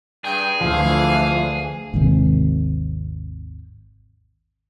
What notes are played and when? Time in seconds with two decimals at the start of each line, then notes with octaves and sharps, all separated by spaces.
0.24 G2 G#4 G5
0.61 D2 E3 F3 A3 D4 F5
1.93 G#1 D#2 C3 D#3